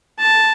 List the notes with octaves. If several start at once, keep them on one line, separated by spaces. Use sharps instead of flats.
A5